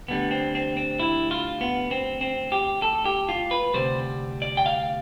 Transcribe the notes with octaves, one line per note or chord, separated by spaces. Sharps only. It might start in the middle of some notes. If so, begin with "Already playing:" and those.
D2 D3 G3 B3
C4
C4
C4
E4
F4
B3
C4
C4
G4
A4
G4
F4
B4
D2 C3 G3 C5
D5
G5
F5